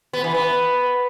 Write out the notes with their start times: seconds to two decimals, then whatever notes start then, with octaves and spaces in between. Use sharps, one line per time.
0.13 B3
0.24 E3
0.34 B3